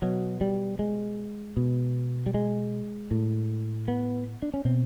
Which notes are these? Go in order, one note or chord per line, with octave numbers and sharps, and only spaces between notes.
B2 F#3
G3
G#3
B2
G3
G#3
A2
B3
D4
C#4
B2 C4